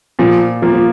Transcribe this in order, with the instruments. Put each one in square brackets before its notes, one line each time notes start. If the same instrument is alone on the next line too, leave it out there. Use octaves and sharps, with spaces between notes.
[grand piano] A#2 [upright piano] F3
[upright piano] F3 [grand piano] A#3
[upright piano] F3